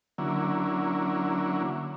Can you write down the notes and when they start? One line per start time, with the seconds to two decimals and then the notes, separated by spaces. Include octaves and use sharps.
0.18 D3 F#3 A#3 C#4 E4